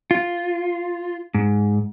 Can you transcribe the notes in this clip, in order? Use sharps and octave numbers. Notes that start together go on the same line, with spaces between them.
F4
G#2